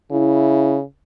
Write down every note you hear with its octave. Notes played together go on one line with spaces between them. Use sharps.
C#3 E4